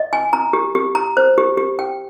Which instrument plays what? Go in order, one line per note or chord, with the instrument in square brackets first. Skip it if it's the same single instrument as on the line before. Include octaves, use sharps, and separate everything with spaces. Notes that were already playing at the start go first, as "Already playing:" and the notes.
Already playing: [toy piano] D#5
G#5
A#5
G4
G4
A#5
C5
G4
G4
G5